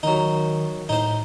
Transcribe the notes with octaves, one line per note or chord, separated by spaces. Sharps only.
D#3 F#3 D#4
A2 D#4 C5